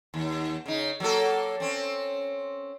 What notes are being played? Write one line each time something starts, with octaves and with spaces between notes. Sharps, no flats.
D#2
C#3 D#4
F#3 A#3 A4
C4 C#4